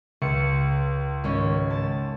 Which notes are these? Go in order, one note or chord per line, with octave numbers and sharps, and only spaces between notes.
C#2 C#7
G#1 C#4
A5